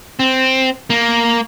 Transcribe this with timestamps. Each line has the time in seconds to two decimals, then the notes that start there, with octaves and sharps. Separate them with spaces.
0.19 C4
0.90 A#3